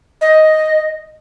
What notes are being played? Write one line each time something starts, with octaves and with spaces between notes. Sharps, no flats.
D#5